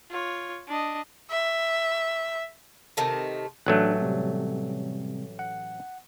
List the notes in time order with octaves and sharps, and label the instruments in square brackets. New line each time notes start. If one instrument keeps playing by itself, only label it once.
[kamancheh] F4 C#5
D4 D#5
[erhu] E5
[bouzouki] C3 D#3 A3
[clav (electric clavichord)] A1 F#3 A3 [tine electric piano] D4 F#6
[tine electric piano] C3 G3 C4
F#5